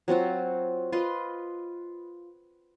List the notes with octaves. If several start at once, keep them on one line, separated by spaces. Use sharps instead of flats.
F#3 C4 F4 F#4
F4 B4 D#5 C6